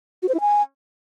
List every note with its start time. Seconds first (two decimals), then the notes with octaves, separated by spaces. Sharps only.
0.23 F#4
0.28 C5
0.34 E4
0.40 G#5